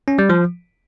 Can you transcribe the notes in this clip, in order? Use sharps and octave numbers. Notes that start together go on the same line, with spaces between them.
C#4
G3
F3